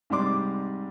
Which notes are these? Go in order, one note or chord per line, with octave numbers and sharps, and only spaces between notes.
G#2 C3 G3 C6 D6